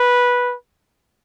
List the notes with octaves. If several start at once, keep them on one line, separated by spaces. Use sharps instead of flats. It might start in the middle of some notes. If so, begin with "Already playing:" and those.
Already playing: B4